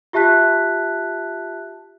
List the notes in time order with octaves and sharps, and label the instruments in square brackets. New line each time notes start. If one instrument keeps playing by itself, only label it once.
[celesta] F4 G4 E5 A5 F#6 B6